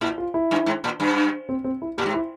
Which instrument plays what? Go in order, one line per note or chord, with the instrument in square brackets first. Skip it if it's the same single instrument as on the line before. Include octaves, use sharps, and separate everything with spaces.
[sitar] A#2 [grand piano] E4
[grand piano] F4
E4
[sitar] G2
G#2
A#2
G2
[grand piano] C4
C4
E4
[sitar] A#2 [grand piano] G4
[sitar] G#2
[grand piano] E4